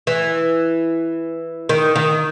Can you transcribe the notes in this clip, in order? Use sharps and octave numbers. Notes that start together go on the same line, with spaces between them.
E3
D#3
D#3